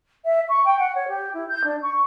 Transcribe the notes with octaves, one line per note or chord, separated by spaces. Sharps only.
E5
C#6
G5
F#5
C#5
G4
E4
G6
D4
C#6